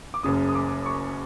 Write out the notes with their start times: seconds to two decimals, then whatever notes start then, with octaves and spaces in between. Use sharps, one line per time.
0.14 D6
0.23 F#1 F#2 C#3 D#6
0.49 D#6
0.55 D6
0.86 C#6